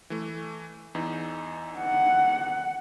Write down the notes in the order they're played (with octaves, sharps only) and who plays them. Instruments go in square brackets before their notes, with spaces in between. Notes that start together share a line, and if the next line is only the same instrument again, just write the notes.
[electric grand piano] E3 A3
E2 E3 D#4
[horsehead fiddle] F#5